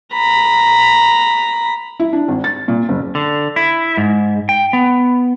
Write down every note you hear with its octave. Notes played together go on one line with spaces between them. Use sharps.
A#5 B5
E4
D4
G#1
A6
A#2
F#1
D3
E4
G#2
G5
B3